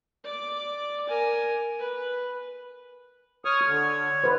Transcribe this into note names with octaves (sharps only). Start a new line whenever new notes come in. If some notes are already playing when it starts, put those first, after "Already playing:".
D5 D6
A#4 G#5
B4
C#5 C#6 D#6 F6
D3
D#3 B4 C5